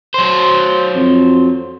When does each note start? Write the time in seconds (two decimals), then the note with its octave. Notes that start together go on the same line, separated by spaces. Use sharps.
0.14 F#3 C5
0.95 F2